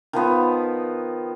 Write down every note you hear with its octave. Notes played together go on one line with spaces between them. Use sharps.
D#3 F3 B3